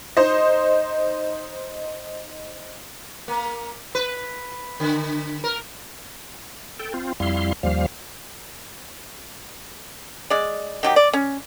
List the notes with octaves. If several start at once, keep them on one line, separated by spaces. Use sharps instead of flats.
D#4 C5 D#5
A#3
B4
D3
A#4
A4 G5
C4 F4
F2 G3 E4 F5 C6
D#2 F3 G3 F5
G#3 D5
D#3 F#3 G4
D5
C#4